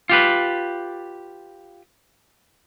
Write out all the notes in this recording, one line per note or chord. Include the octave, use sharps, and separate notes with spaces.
F4 G4 B4